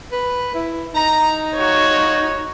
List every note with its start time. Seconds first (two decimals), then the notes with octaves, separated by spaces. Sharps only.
0.12 B4
0.55 E4
0.94 D#4 A#5
1.57 F4 F#4 C#5